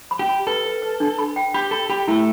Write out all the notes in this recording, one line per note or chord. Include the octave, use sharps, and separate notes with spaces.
B5
G4
B5
A4 B4
B4
B4
D4
B5
G5
G4 B5
A4 B5
G4 B5
A3 E4